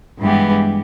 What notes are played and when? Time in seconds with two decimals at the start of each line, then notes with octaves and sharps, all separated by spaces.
0.20 G2 E3 G#3 B3 G4